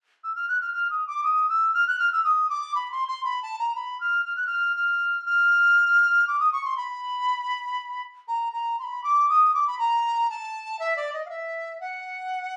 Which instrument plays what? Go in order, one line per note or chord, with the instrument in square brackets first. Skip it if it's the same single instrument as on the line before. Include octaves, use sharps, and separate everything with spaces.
[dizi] E6
F6
F#6
F6
F6
D#6
D6
D#6
E6
F6
F#6
F6
E6
D#6
D6
B5
C6
C6
B5
A5
A#5
B5
F6
F6
F#6
F6
F6
F6
D6
D#6
C#6
C6
B5
A#5
A#5
C6
B5
D6
D#6
D6
B5
A#5
A5
E5
D5
D#5
F5
E5
F#5